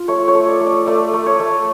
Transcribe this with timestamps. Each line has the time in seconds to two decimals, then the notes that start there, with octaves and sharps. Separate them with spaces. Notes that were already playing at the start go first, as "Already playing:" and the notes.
Already playing: F4
0.08 A3 C#5
0.28 C#5
0.35 A3
0.48 D5
0.60 A3
0.67 D5
0.86 A3 D5
1.13 A3
1.26 C#5
1.40 A3